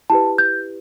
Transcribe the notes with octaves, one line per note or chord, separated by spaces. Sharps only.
E4 G4 B4 A5
G6